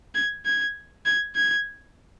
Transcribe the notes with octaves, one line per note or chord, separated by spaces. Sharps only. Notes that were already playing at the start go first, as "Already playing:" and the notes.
G#6
G#6
G#6
G#6